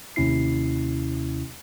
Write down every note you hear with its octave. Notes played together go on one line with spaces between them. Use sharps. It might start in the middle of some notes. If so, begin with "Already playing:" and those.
D#2 C3 C#4 E4 C7